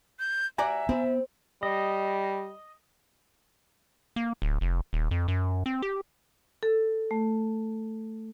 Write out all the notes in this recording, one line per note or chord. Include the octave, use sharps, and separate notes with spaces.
G6
F#4 G4 D5 E5 G#5 A#5
B3 C4
G3 D#5
A#3
D1
F1
D#1
F2
F#2
C4
G4
A4
A3